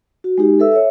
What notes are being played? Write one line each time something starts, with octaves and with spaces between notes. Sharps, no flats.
F#4
G#3 D#4 G4
A4 B4 E5 E6
C#5 E5